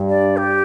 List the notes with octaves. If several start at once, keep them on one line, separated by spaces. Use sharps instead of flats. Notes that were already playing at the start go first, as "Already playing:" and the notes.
Already playing: G2
D5
G4